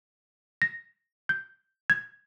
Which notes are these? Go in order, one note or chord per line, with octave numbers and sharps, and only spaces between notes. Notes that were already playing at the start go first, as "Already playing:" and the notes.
A#6
G6
G#6